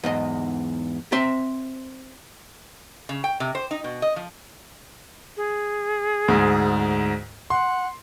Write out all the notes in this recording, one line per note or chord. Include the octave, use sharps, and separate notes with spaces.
E2 G#2 D#5
C4 C5 E5 C6
C#3
G5
C3
C5
D#4
B2
D#5
F3
G#4
D2 G#2
F#5 C6